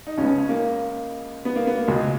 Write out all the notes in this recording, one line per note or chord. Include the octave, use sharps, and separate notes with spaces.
D#4
C#2 C#3 C#4
B3
C#4
C#4
A#3
B3
A#3
B3
A#3
C#2 B2 G#3